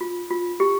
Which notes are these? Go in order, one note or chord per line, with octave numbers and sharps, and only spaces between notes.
F4
F4
G4